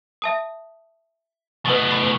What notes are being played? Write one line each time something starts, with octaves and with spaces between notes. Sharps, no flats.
E5 A5 D#6
A2 B3 B4 D#6 A6
B5 A6 C7